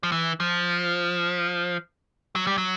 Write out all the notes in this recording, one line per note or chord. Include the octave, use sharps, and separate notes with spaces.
F3
E3
F3
F#3
G3
F#3